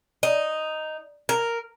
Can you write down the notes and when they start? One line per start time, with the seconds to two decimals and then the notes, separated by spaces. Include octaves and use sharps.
0.23 D#4
1.29 A#4